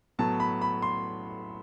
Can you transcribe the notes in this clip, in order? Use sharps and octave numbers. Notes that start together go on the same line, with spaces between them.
A2 F#3 B3 A5
B5
B5
C6